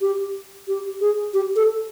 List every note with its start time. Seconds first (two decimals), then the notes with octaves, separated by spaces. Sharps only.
0.01 G4
0.68 G4
1.01 G#4
1.34 G4
1.56 A4